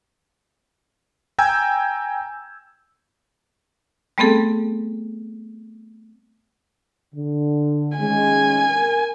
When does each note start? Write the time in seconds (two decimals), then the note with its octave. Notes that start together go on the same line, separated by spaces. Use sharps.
1.39 G5 G#5 A#5 E6 G6 G#6
4.18 G3 A3 B3 C4 G#4 A4
7.14 D3
7.98 D#3 G#3 C#4 G#5
8.71 A#4